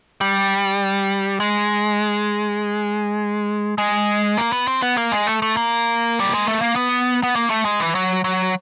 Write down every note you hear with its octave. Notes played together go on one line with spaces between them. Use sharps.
G3
G#3
G#3
A#3
B3
C4
B3
A#3
G#3
A3
A3
A#3
G3
G#3
A3
A#3
B3
B3
A#3
A3
G#3
E3
F#3
F#3